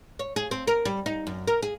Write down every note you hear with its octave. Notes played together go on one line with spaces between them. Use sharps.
C#5
G#4
C4
A#4
G3
D#4
F#2
A#4
G#4